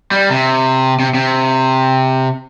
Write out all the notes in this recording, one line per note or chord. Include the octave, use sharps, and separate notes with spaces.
G3
C3
C3
C3